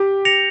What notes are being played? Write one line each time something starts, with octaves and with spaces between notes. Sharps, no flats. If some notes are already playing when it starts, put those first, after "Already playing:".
Already playing: G4
A#6 C#7 F7